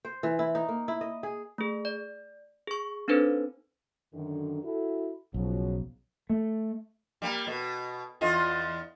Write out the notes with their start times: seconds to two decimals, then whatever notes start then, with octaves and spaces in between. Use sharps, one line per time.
0.05 C5
0.23 E3
0.39 E4
0.55 D#4
0.69 A#3
0.88 E4
1.01 D#5
1.23 G#4
1.58 A3 G#4
1.85 D5
2.67 G#4 C#6
3.08 C4 D4 D#4 A4 B4 C5
4.14 F#2 D3 D#3
4.63 E4 F#4 A4
5.34 B1 C#3 F3 F#3
6.30 A3
7.22 G3 A#3
7.47 B2
8.21 E2 F4 D#5